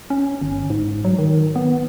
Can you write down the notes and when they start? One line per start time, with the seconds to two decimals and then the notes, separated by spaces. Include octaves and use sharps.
0.10 C#4
0.42 G1
0.70 G#2
1.05 F#3
1.18 D#3
1.56 B3